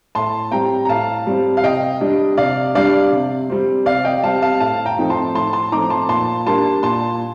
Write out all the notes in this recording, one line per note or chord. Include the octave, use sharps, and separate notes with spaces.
A2 A5 C6
G3 C4 G5 A#5
A#5
A2 F5 A5
G3 C4
F5
C3 D#5 G5
G3 D4
C3 D5 F5
G3 D4 D5 F5
C3
G3 C4
C3 D5 F5
D#5 G5
G3 C4 F5 A5
F5 A5
A2 F5 A5
G5 A#5
F3 A3 C4 D#4
A5 C6
A2 A5 C6
A5 C6
F3 A3 C4 D#4 A#5 D6
A5 C6
A#2 A5 C6
G3 A#3 D4 A5 C6
A#2 A5 C6